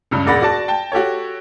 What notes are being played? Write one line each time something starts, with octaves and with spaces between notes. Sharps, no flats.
C#2 G2 C#3
E1 A#1 D5 F#5 B5 A#6
F#4 D5 A5
G5 A5
F#4 G4 A4 C#5